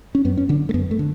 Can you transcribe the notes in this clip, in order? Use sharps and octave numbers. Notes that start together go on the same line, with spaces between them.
C#4
F#2 B3
C#4
D3 D4
A3
F#2 B3
A3
D3